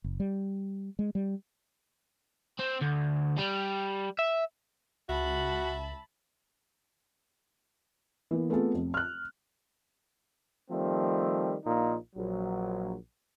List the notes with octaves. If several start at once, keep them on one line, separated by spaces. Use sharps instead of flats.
F#1
G3
G#3
G3
C4
D2
G3
E5
C#2 F#4 E5 A5 B5
E3 A#3 B3
A3 B3 C4 F4 G#4 A4
F1
F6 F#6
D#3 F3 G3 A3 C4
A#1 A#2 A#3 D#4
A#1 F#3